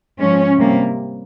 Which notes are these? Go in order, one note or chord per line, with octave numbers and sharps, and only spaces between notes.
G#2 F3 G#3 C#4
C3 G3 A#3